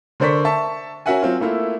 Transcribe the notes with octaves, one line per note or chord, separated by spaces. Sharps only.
D3 A#4 C5 D5 C#6 B6
E5 A5 C#6
C#4 F#4 A#4 E5 F#5 G#5
F#3 C4 F4
A3 A#3 E4 F4